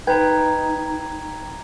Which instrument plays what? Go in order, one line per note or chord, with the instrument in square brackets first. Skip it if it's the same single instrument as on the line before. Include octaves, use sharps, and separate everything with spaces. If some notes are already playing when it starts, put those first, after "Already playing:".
[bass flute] D#4 [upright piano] B4 [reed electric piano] G5 [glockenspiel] A#5 G#6